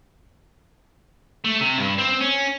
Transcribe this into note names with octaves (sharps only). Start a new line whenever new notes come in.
A3
C3
G2
C4
C#4